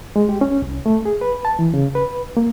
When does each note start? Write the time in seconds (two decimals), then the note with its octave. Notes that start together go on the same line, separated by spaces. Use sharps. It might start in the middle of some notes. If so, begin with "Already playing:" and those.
0.16 G#3
0.29 G4
0.41 C#4
0.62 C2
0.86 A3
1.05 G#4
1.21 B4
1.45 A5
1.59 E3
1.74 C#3
1.95 B4
2.37 A#3